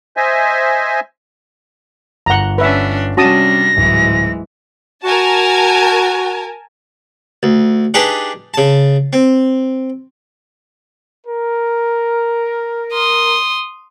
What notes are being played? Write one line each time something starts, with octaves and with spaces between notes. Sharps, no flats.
C5 D#5 E5 G#5
G1 F#5 A#5 G7
C#4 D4 B4 E5
C3 G3 C#4 D4 F#4 A5 D#6 A#6
D1 G#2 E3 G#3
F#4 A#4 G#5 A5
D2
D4 D#4 G4 G#4 B4 D#5
C#3 A5
C4
A#4
C6 D#6